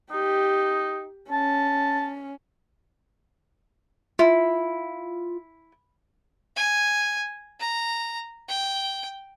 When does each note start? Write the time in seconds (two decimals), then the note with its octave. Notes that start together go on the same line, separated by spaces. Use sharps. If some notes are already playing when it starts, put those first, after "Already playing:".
0.11 D#4 G4
1.31 C#4 A5
4.19 E4 F4
6.56 G#5
7.60 A#5
8.48 G5